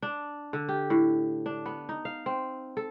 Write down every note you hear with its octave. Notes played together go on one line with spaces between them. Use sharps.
D4
D3
G4
A2
D4
B3
D#4
F5
C4
A4